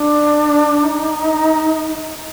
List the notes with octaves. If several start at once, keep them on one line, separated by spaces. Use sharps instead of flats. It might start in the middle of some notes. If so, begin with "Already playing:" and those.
Already playing: D4
D#4